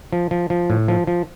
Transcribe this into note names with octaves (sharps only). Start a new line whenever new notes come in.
F3
F3
F3
A2
F3
F3